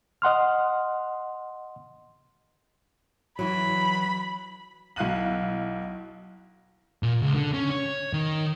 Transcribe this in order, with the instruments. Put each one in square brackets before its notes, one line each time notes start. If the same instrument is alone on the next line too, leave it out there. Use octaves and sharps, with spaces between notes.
[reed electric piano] D#5 F#5 C6 F6
[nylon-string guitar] E3 F#3 [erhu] B5
[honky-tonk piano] B1 E4 F5 F#6 D#7 F#7
[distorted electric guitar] A#2
C#2
D3
C#4
C#5
D#3